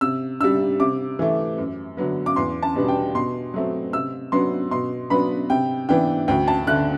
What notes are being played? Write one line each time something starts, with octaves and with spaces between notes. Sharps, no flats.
C3 E6
G3 D4 E6
C3 D6
E3 A3
F#2
D3 F#3 B3
D6
E2 C6
A5
B2 G3 B3 D4
G5
B2 C6
F#3 A3 C4
C3 E6
F#3 B3 D4 C6
B2 C6
F#3 B3 D4 B5
C3 G5
E3 B3 D4 G5
D2 G5
A5
D3 A3 F#6